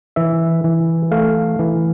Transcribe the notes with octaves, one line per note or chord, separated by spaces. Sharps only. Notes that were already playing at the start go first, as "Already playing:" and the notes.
E3 E5
E3
A3 F5
E3